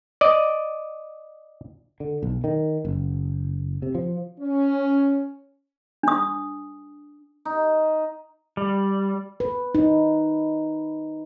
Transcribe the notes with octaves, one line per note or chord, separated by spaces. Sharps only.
D5 D#5
D3
B1
D#3
F#1
C3
F3
C#4
D4 D#6
D#4
G3
B4
D#4